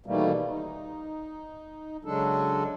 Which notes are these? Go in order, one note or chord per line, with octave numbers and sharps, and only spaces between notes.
B2 D#3 E3 G3 A3 A#3
D#4
C#3 F#3 G#3 D4 A4